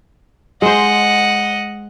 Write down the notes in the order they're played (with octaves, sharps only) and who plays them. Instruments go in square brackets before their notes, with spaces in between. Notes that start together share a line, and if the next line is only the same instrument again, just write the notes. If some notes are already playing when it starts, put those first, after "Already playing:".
[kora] G#3 C5 [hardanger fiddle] D#5 F#5